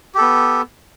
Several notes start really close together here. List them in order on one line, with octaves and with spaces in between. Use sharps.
G4 A4 B3